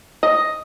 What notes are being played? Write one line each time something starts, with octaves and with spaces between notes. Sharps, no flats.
D#5